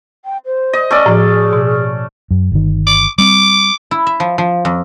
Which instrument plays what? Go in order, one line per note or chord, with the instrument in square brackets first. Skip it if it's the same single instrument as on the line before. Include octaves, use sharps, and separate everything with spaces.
[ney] G5
C5
[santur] D#5
A3 C#4 D5
[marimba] A2 F3 [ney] G#4
[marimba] B2
[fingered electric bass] F#2
G1 D#3
[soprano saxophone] D6
[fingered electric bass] G3 C4 [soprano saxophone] D6
[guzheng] E4
E5
F3
F3
F2